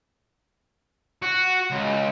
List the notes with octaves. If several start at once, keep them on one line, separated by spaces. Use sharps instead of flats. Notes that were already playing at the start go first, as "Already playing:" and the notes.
F#4
C#2